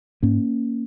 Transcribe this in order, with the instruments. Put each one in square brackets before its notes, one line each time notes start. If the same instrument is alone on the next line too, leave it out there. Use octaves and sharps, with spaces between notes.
[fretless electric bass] G#2 A#3 C#4